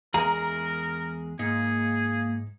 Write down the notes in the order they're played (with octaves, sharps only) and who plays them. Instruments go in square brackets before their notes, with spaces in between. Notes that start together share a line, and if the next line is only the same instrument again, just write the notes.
[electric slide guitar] E2 G#3 G#4 [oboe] A#4 [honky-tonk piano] A#5
[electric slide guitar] G#2 D#4 [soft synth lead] A#3 [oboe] G#4